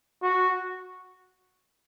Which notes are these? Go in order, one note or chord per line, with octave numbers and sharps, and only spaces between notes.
F#4